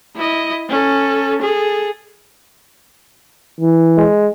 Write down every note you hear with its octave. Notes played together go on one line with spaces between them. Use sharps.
E4 D#5
C#4 A4
G#4 A4
E3
G#3